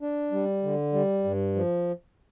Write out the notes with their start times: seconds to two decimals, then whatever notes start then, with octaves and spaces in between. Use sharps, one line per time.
0.01 D4
0.32 G3
0.63 D3
0.93 G3
1.24 G2
1.55 F3